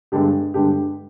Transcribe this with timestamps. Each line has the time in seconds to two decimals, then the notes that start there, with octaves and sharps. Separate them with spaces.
0.12 G2 D3 G#3 D4 G4
0.54 G2 D3 G#3 D4 G4